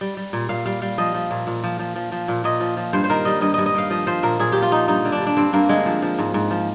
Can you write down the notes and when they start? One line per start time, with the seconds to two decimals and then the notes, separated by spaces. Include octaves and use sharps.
0.01 G3
0.17 G3
0.33 A#2
0.49 A#2 F5
0.66 G3 F5
0.82 G3 F5
0.98 F3 D#5
1.15 F3
1.31 A#2
1.47 A#2
1.64 F3
1.79 F3
1.96 F3
2.12 F3
2.28 A#2
2.44 A#2 D#5
2.60 F3
2.77 F3
2.93 G2 C5
3.04 C5
3.10 D#3 A#4
3.25 G3 D#5
3.41 G2 D#5
3.54 G2 D#5
3.66 D#5
3.74 D#3 F5
3.90 F3 D#5
4.07 F3 C5
4.23 A#2 A#4
4.40 A#2 G#4
4.52 F3 G4
4.62 F4
4.71 F3 D#4
4.88 G2 D#4
5.05 D3
5.12 D4
5.20 G3
5.27 D4
5.37 G2 C4
5.53 G2 A#3
5.69 D3 G#3
5.86 F3
6.02 F3
6.19 G#2
6.34 G#2
6.51 F3